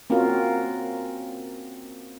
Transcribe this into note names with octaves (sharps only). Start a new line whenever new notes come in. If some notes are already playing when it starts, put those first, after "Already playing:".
A#3 C4 C#4 F4 F#4 A#4